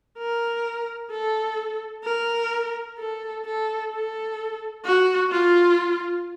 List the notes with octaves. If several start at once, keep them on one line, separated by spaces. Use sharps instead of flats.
A#4
A4
A#4
A4
A4
A4
F#4
F4